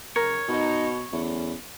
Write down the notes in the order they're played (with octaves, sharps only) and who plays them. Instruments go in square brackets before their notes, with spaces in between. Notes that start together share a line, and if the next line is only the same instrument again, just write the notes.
[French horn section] C#3 F#3 [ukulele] A#4 [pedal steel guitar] C#5
[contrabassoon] B2 [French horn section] D#4
[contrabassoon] E2 [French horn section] D3 A3 C#4